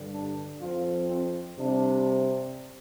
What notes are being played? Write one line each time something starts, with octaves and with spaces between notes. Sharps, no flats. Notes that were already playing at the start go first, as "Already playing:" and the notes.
Already playing: G2 D3 G3
D4
F2 F3 C4 F4
C4
C3 G3 C4 D4